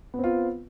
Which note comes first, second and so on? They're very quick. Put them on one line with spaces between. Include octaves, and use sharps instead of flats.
B3 C4 F4